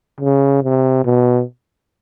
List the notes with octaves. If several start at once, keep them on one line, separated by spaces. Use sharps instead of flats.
C#3
C3
B2